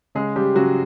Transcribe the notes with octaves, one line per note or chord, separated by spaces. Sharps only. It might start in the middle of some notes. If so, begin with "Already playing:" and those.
C#3 G#3 G#4
C#3 G3 G4
C#3 F#3 F#4